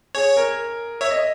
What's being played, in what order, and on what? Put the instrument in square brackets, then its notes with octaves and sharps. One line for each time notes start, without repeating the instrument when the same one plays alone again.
[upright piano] G#4 [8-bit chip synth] C#5
[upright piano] A#4
[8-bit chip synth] C#5 [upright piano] E5
[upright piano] D#5